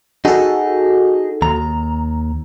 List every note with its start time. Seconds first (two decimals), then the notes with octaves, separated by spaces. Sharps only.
0.25 D#4 F#4 G#4 A4
1.42 D#2 A#5